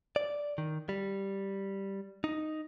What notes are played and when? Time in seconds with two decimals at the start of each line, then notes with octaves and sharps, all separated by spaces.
0.16 D5
0.58 D#3
0.89 G3
2.24 D#4